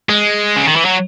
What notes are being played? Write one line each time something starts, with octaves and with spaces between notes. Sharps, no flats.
G#3
C#3
D#3
E3
F#3